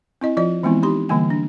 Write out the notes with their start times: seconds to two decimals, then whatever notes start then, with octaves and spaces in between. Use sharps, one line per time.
0.21 C4 E4 D#5
0.37 F3 F4 D5 D#5
0.63 E3 G#3 B3 C4 E4
0.83 D#4 G4 C6
1.09 D3 E3 G3 A#3 G#5
1.30 D4